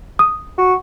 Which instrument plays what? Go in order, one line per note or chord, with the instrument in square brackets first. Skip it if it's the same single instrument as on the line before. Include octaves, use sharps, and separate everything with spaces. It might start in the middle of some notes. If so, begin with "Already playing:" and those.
[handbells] D#6
[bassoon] F#4